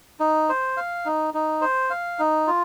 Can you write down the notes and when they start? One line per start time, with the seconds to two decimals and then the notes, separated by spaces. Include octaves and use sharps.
0.20 D#4
0.49 C5
0.77 F5
1.05 D#4
1.34 D#4
1.61 C5
1.90 F5
2.19 D#4
2.47 F4